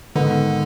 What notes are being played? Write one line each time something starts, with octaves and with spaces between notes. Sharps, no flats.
G#2 D3 D#3 B3